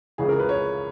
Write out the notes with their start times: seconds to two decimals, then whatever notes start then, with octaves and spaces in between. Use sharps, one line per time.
0.18 C#2 C#3 E3 G#4
0.29 A#4
0.39 B4
0.49 C#5